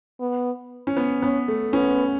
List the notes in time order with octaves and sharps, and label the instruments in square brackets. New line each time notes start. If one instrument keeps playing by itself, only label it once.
[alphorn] B3
[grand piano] C#4
B3
[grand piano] B3 [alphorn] C#4
[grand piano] A3
[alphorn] B3 [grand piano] C#4